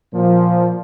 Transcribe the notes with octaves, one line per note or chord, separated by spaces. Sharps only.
A#2 F3